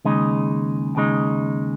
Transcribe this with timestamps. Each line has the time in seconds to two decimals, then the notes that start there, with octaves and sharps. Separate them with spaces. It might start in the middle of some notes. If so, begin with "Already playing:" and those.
0.05 D#2 C#3 G#3 D#4
0.95 D#2 C#3 G#3 D#4